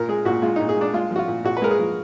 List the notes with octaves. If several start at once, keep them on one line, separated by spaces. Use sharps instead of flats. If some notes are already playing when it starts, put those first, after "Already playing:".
Already playing: A#2 A#4
G#3 G#4
A#2 F#4
G#3 F4
D#4
A#2
G#4
G#3 D4
G#3 F4
F3 F#4
F4
A#2
A#2 F#4
B4
G#3 A#4
G#4
F3